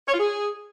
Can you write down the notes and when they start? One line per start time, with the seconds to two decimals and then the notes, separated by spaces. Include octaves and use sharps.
0.08 C#5
0.14 F4
0.19 G#4